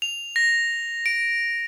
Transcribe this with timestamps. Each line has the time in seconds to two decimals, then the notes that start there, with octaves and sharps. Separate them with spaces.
0.02 F7
0.36 A#6
1.06 D7